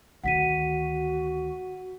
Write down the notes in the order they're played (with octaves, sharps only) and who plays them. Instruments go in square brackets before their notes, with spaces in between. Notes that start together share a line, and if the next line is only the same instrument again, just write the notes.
[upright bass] D2 D#3 [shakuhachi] F#4 [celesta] F#5 B6 D#7